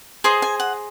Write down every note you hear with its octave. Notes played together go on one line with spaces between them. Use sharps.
G#4 C5 D#5 C6
G#5
F#5